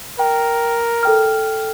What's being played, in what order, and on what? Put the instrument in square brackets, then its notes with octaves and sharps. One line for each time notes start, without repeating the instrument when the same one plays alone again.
[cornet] A#4 [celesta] G5
[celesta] A4 G5 F6